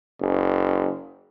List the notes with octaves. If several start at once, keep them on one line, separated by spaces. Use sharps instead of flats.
F#1